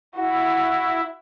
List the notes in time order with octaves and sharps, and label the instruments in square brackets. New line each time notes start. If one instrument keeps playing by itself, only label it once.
[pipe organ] E4 [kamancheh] F#4